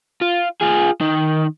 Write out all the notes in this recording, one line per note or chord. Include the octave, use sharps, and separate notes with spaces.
F4
F4 G#4
D#3